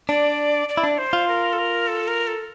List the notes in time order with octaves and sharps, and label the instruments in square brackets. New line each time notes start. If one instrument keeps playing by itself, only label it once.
[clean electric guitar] D4 [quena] D5
[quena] D5
[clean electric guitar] E4
D4
[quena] C5
[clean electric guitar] F4
[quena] A#4
A4
A#4
A4
A#4
A4